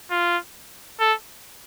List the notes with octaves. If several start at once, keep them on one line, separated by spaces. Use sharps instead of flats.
F4
A4